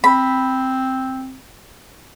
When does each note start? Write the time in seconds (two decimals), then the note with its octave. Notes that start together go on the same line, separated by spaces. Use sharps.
0.04 C4 B5